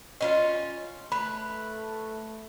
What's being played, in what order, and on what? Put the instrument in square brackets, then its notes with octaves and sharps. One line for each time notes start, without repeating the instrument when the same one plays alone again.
[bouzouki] C#4 D#4 F4 [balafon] D#5
[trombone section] A3 [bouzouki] B4 [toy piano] B5